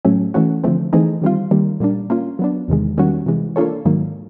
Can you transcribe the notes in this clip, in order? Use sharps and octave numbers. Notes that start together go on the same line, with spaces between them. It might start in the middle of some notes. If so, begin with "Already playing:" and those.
A2 F#3 A3 C#4
E3 A3 C#4 F#4
D3 F3 A3 C4
E3 A3 C4 D#4 G#4
D#3 G3 C4 F4
D#3 G3 A#3
A#2 G3 A#3 D4
A#3 C#4 F4
F#3 B3 D4
E2 C3 D#3 G#3
D#3 G3 A#3 C#4 F#4
C3 E3 G#3
A#3 D4 F4 A4 C#5
G#2 D#3 F#3 A#3